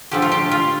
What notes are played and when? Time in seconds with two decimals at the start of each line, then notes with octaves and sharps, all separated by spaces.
0.11 D3 F3 A3 G4
0.22 F4
0.32 G4
0.51 F4